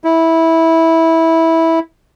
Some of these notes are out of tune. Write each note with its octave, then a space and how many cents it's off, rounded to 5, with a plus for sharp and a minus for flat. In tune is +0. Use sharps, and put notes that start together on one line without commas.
E4 -15